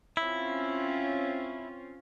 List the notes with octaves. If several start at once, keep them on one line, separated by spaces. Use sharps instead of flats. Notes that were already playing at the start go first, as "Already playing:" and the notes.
C4 C#4 E4 F4